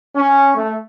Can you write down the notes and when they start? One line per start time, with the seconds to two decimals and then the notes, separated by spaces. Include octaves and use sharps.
0.16 C#4
0.55 A3